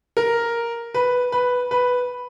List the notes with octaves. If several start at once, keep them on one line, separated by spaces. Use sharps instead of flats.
A#4
B4
B4
B4